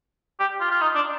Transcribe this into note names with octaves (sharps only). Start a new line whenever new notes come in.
G4
F4
F4
D#4
D4